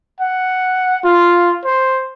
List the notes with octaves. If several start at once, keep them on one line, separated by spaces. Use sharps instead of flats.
F#5
F4
C5